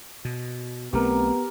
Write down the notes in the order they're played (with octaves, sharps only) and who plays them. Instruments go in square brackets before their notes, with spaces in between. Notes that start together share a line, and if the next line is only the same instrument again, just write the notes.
[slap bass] B2
[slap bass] B1 A3 C4 [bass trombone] B3 [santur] G4 A#4